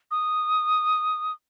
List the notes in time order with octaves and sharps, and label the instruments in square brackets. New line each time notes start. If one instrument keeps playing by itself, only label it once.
[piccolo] D#6